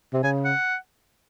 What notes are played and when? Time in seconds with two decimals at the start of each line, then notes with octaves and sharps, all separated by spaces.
0.13 C3
0.23 C#3 G#5
0.44 F#5